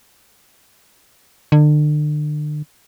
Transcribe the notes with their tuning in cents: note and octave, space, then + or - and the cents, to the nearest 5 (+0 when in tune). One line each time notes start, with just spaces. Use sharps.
D3 +35